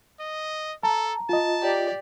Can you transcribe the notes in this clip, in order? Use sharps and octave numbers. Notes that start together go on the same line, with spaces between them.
D#5
A4 A5 A#5
F4 D#5 A5
G4 D5